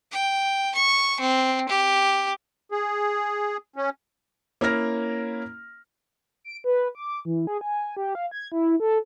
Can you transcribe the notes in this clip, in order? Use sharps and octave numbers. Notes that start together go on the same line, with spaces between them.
G5
C#6
C4
G4
G#4
C#4
A#3 C#4 E4 A#4 F6 A#6
D7
B4
D6
E3
G#4
G#5
G4
F5
G#6
E4
A4